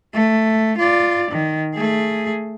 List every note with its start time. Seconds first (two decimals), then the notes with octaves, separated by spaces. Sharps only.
0.13 A3
0.77 F4 D5
1.30 D#3
1.75 A3 G#4